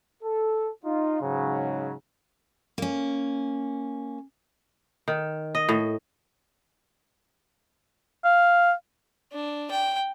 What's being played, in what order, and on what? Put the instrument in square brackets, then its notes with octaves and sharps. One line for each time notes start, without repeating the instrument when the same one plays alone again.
[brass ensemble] A4
D#4 F4
G#2 C#3 F#3
[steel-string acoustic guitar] A#3 C#4
[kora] D#3
D#5
A2
[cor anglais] F5
[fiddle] D4
G5